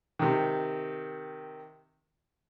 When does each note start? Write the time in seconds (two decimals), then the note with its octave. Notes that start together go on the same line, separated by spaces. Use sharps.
0.19 C3 D#3